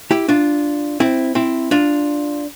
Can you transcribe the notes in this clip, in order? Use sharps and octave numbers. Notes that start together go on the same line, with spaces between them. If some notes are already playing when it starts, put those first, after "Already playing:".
E4 G4
D4 F4
C4 E4
C4 E4
D4 F4